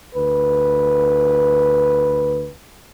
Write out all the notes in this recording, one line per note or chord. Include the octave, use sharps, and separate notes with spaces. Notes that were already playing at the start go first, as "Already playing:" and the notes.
D2 B4